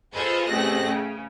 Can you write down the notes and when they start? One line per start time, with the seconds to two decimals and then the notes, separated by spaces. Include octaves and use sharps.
0.14 F4 G#4 A4 B4 C5 D#5
0.47 A1 C3 A3 G#4 F#6 A#6
0.87 C#3